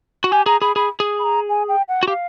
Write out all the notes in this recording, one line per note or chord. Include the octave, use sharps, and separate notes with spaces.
F#4
G4 G#5
G#4 A#5
G#4 B5
G#4 B5
G#4
B5
A#5
G#5
G5
F#5
F#4
G4 F5